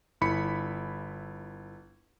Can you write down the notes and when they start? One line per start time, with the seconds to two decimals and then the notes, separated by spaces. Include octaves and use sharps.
0.21 G1 E4 B5 C#7